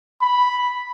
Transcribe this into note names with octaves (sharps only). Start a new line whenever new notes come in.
B5